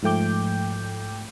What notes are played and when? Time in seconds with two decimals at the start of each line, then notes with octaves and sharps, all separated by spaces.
0.03 G#2 F3 A3 G5 D6 G6